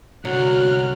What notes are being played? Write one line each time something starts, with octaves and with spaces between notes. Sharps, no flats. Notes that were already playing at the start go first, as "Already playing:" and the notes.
C2 D3 F#3 F#4 C#5 F6 F#6